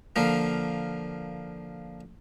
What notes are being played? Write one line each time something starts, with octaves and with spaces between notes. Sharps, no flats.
D3 F3 A#3